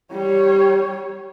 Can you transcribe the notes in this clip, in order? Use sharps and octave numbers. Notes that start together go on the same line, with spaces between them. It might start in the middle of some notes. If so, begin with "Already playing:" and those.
G3 C#5